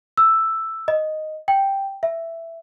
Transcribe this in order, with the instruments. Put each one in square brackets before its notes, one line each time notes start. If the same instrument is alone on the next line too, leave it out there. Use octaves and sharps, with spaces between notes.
[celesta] E6
D#5
G5
E5